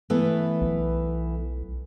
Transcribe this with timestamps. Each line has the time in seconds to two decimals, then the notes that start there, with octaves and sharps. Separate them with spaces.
0.10 E3 A3 B3
0.62 B1